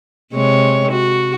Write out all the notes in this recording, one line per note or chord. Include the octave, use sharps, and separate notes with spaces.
C3 G#3 C#5
F#4